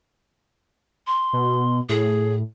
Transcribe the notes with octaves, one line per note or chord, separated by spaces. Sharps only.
C6
B2
A2 G#4